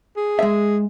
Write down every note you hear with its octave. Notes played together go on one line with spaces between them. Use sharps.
G#4
G#3 E5